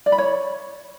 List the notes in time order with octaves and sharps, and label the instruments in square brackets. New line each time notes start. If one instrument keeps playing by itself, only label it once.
[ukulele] D5
B5
C#5